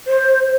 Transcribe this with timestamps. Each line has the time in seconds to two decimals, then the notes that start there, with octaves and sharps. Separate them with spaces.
0.07 C5